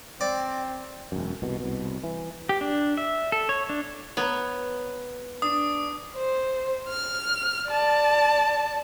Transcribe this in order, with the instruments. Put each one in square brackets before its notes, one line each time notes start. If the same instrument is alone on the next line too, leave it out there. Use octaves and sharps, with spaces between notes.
[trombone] C4 [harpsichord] D5
[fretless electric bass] E1 F#2
C2 B2
C2 B2
E3
[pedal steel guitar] G4
D4
E5
A4
C#5
D4
[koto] B3 [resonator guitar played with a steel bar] C#5 A#5
[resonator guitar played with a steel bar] D4 [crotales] D#6
[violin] C5
F6
D5 A5